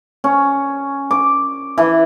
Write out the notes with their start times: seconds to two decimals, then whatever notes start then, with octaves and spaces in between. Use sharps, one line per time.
0.24 C#4
1.11 D6
1.78 E3